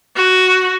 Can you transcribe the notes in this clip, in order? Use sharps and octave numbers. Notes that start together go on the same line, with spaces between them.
F#4